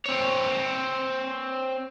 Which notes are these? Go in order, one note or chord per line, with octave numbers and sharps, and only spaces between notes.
C4 C#5